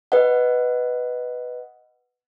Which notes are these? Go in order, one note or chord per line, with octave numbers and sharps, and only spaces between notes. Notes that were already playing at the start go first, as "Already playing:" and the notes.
B4 D#5 F#5